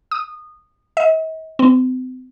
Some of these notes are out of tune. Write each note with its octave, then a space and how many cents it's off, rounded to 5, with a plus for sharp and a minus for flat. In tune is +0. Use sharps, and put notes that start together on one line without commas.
D#6 -20
D#5 +45
C4 -40